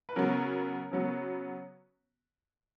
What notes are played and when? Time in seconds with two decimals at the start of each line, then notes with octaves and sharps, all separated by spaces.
0.09 B4
0.16 C#3 F#3 B3 A#4
0.91 C#3 F#3 B3